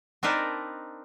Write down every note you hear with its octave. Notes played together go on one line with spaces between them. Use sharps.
C4 D4 D#4 A#4 B4 A5